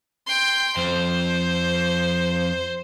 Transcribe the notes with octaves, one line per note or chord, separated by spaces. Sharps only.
G5 C6
F2 C5